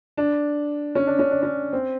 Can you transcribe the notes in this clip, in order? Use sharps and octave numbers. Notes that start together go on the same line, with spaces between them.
D4
C#4
D4
C#4
D4
C#4
C4